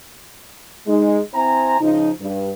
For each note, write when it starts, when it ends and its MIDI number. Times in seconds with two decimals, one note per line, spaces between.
0.88 1.21 56
0.88 1.21 63
1.35 1.77 60
1.35 1.77 64
1.35 1.77 72
1.35 1.77 80
1.35 1.77 82
1.81 2.11 49
1.81 2.11 53
1.81 2.11 63
2.21 2.52 43